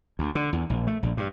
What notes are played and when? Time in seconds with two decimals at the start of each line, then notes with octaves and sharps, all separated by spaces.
0.19 D2
0.35 D3
0.53 E2
0.70 A#1
0.87 A3
1.03 A#1
1.17 G2